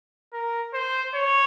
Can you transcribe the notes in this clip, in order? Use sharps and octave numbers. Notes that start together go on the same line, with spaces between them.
A#4
C5
C#5